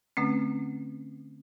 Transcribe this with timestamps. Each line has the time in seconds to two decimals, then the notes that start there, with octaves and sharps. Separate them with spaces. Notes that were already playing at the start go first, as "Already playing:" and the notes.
0.17 D3 A3 C4 C#4